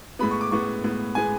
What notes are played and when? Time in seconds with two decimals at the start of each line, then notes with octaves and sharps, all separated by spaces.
0.19 A2 G#3 B3 B5
0.31 C#6
0.41 D6
0.51 A2 G#3 B3 C#6
0.84 A2 G#3 B3
1.15 A2 G#3 B3 G#5